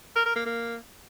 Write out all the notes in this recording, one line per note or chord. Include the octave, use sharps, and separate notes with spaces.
A#4
A#4
A#3
A#3